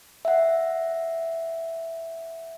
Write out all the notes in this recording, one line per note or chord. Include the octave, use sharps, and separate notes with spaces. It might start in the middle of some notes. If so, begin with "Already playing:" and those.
E5 F#5